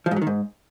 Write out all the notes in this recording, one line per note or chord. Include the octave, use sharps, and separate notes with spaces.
F3
G#2
F#3
D#3
G#2